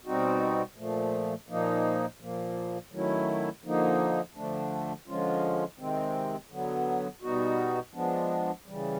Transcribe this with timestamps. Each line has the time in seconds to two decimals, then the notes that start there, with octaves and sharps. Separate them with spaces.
0.06 B2 G3 C4 D#4 F#4
0.76 A#2 F3 A3
1.49 A#2 F3 A#3 D#4
2.20 A#2 F3 A#3
2.92 D#3 F#3 A3 C#4 E4
3.64 D3 F3 A#3 D#4
4.35 D3 F3 A3 D4
5.07 D3 F3 G#3 C#4 F4
5.79 C3 D#3 G#3 C4
6.50 D3 F#3 B3
7.22 B2 G3 B3 D#4 F#4
7.94 F3 G#3 B3 D4
8.66 C#3 E3 G3